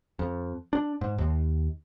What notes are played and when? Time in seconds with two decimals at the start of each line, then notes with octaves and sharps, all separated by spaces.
0.19 F2
0.73 D4
1.01 G#2
1.18 D#2